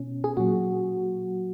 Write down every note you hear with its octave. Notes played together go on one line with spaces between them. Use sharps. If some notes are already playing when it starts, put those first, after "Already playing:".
Already playing: B2 C#4
G#4
A#2 F#3 F#4